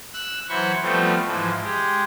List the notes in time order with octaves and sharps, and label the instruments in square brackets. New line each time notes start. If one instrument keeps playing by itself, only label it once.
[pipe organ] E6 F#6
E3 F#3 C5 B5 C#6
F3 G3 A3 B3 C4
G#2 E3 F3
G#3 G4